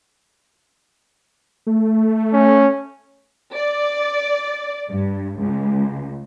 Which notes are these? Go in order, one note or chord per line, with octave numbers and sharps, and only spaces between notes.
A3
C#4
D5
G2
C#2